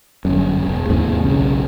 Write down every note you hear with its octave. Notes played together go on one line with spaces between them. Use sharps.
G1 F#2
E1
D#2 G#2 C3 E3
B1 C#3